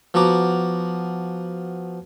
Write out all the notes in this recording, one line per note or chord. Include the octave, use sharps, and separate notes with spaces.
F3 B3 F#4 A#5 D6